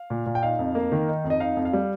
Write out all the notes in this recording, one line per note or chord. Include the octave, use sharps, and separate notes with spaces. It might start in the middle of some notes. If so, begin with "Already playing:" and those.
Already playing: F5
A#2
A#2
G5
D#4 F5
F2
A#3
D#3
D#4
F2
D#5
D#4 F5
F2
F5
G3